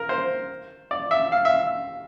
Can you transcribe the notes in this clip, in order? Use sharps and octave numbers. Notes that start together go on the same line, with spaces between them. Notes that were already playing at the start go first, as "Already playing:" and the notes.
Already playing: A#4
C5
D5
E5
F5
E5